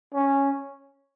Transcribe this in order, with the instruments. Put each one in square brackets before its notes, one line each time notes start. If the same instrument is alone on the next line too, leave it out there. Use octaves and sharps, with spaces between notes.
[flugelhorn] C#4